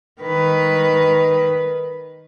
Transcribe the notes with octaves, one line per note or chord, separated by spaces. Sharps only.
D#3 B4